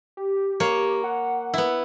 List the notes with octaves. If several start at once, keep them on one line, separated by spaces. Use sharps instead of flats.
G4
A#3 C#5
F#5
B3 E4